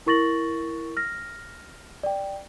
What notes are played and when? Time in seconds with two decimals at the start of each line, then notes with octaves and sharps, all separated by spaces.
0.06 E4 A#4 C#6 A6 A#6 F#7
0.97 F6 A#6
2.03 D5 G5